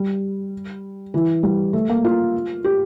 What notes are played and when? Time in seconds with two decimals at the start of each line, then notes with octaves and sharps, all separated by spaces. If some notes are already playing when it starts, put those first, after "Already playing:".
Already playing: G3
1.14 E3
1.43 G3
1.73 A3
1.89 A#3
2.04 F4
2.64 G4